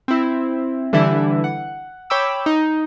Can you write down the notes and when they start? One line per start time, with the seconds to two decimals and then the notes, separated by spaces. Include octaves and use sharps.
0.08 C4 E4
0.93 D3 E3 G3 D4 E4
1.44 F#5
2.10 C#5 G5 B5 D6 E6
2.46 D#4